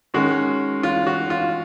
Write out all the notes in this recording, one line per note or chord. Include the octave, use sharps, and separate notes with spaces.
D#3 G#3 C#4 F#4
F4
F#4
F4